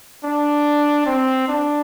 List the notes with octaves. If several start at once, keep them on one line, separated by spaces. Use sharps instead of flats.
D4
C4
D4